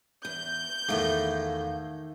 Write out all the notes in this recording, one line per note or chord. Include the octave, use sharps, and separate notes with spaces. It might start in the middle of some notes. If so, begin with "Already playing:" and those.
E2 G6
E2 A2 D#3 A3 F5